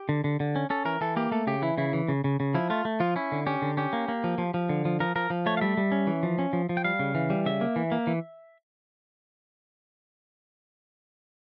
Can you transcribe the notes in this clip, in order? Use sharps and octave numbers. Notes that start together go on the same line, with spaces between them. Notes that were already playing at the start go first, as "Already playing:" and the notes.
Already playing: G4
D3
D3
D3
C#4
C#4 A4
E3 A#4
E3 A4
A#3 G4
A3 A4
C#3 G4
E3 E4
C#3 E4
E3
C#3
C#3
C#3
F3 E4
A3 F4
A3
F3 F4
C#4 E4
D3
C#4 G4
D3
C#4 G4
A#3
A#3
F3
F3
F3
D3
F3
F3 A#4
F3 A#4
F3
A3 C#5
F5
G3 E5
G3
C#4
E3
F3
C#4
F3
F3
G5
G3 F5
C#3
E3
G3
C#3 E5
A#3
E3
A#3
E3